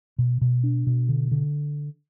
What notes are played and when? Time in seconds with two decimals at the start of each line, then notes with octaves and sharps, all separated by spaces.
0.19 B2
0.41 B2
0.64 D4
0.87 B2
1.09 D3
1.32 D3